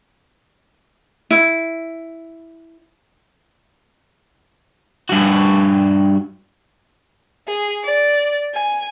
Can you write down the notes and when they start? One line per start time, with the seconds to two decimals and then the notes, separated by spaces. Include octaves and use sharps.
1.31 E4
5.10 G2 F#4
7.47 G#4
7.83 D5
8.53 G#5